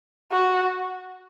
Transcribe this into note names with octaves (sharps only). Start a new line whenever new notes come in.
F#4